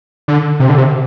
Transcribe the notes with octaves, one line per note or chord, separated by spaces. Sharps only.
D3
C3
D3
C3